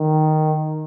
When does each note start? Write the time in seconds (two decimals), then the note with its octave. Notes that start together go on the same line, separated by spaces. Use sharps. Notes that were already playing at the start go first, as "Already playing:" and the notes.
Already playing: D#3